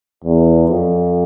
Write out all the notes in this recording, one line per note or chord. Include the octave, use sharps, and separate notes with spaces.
E2
F2